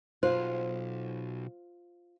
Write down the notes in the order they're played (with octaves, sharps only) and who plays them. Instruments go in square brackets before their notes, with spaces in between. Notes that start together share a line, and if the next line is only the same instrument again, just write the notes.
[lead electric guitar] B1 [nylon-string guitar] F4 [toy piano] C5